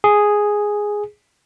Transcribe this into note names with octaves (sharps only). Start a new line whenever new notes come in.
G#4